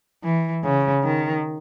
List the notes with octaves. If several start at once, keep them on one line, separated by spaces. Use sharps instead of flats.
E3
C#3
D#3